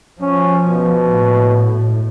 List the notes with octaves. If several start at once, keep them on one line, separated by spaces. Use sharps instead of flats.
F3 C#4
B2
A2